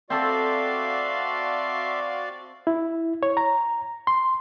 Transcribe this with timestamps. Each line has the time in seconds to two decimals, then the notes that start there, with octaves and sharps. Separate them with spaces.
0.10 C4 F#4 A4 D5 E5 F5 C6
2.67 E4
3.23 C#5
3.37 A#5
4.07 C6